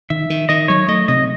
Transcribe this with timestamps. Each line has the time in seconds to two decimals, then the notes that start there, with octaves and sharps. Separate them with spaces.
0.10 D#3 E5
0.30 D#3
0.49 D#3 D#5
0.68 F#3 C#5
0.88 A3 D#5
1.08 C3 D#5